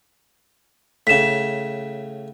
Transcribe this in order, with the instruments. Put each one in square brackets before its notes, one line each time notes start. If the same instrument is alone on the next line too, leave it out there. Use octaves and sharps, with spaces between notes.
[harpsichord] A2 C#3 [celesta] B6 E7